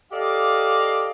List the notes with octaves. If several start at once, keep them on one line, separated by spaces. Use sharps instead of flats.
G4 A4 D5 D#5 F5